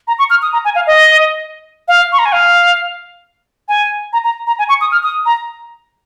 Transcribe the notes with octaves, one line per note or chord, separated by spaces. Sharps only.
A#5
C#6
F6
D#6
A#5
G#5
F5
D#5
F5
C#6
A#5
G#5
F5
G#5
A#5
A#5
A#5
G#5
C#6
D#6
F6
D#6
A#5